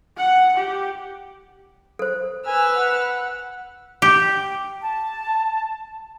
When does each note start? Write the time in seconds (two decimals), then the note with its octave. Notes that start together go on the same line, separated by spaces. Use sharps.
0.17 F#5
0.57 G4
1.99 A4 C5
2.47 B4 G#5 E6 F6
2.76 F#5
4.02 G4
4.81 A5